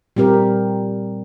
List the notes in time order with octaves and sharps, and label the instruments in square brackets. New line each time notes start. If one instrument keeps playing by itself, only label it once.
[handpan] A#2 G3 C4 G4 A#4